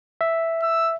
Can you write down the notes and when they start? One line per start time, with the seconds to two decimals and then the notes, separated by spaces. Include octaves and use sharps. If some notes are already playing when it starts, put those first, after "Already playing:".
0.21 E5
0.62 E6